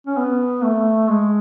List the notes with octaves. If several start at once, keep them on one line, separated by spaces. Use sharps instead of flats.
C#4
B3
A3
G#3